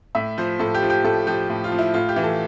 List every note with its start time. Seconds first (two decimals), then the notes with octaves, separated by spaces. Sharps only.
0.15 A2 E5
0.38 F3 C5
0.59 A2 A4
0.75 G4
0.83 F3
0.90 G4
1.04 A2 A4
1.27 F3 G4
1.50 A2
1.64 F4
1.72 F3
1.79 E4
1.94 A2 F4
2.09 G4
2.16 E3
2.24 A4